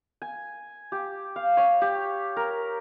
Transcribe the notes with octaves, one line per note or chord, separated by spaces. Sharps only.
G#5
G4
F5
C#5
G4
A#4